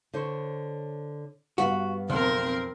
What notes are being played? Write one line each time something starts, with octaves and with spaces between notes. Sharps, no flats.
D3 C5 C#5
G2 B3 F#4 F5
B1 F2 C4 A#4